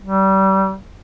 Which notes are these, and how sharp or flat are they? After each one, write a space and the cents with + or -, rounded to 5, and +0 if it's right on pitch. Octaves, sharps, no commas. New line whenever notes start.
G3 -30